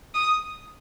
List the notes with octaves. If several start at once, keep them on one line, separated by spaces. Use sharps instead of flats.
D#6